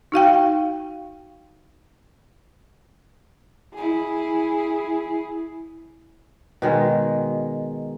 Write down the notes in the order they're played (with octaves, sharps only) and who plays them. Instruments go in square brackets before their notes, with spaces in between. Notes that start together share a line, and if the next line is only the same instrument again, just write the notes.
[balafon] D#4 F#4 F5 G5
[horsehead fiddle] E4 G#4
[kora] B2 D#3 G#3